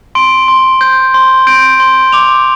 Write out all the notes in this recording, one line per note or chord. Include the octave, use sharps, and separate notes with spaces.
C6 D7
C6
G6
C6
G6 D7
C6
D6 F7